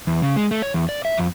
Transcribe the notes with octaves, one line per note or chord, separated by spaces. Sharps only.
E2
C#3
G#3
A3
C#5
E2
D5
E5
F2